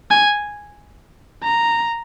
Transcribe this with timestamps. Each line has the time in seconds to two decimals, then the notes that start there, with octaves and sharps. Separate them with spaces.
0.10 G#5
1.43 A#5